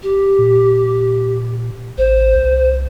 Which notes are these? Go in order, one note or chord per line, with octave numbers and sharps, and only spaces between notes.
G4
A#2
A1 C5
C2